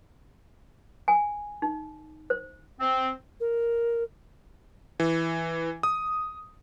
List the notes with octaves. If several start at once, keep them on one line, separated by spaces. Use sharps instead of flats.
G#5
D#4
C5
C4
A#4
E3
D#6